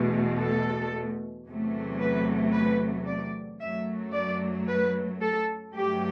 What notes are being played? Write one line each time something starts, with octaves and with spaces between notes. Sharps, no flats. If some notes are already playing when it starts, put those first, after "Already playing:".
Already playing: E2 B2 A3
A4
E2 C3 F#3 A3
B4
B4
D5
F#2 F#3 A3 E5
D5
B4
A4
G2 F#3 A3 G4